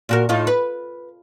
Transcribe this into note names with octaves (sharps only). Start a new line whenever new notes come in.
A#2 F#4 A#4
A2 D#4 F4
B4